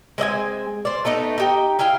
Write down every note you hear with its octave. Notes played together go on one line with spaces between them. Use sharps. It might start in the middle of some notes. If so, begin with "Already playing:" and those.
G#3 C4 D#5 G#5
C5 D5
A3 B3 D#4 D#5
D#4 G4 G5
E4 G#4 F5 G5